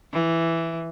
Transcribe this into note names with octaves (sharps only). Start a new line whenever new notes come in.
E3